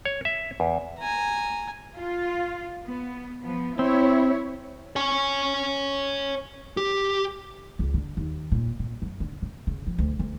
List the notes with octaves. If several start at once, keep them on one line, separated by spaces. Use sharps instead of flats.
C#5
E5
E2
G#5 A#5
F4
B3
F3 B3
C4 E4 C#5
C#5 G#5
G4
C#2
D3
D#2
A#2
A#2
F#2
D3
C#3
C#3
F3
D2
D2